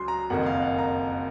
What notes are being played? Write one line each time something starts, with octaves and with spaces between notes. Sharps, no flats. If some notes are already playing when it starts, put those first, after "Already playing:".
Already playing: C#2 C#3 F#3 C6
A#5
F#1 F2 D#3 F#5
F5
F#5
A#5